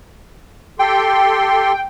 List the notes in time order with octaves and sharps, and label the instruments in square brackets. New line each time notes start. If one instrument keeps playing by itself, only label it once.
[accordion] G4 A4 C6 [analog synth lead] G5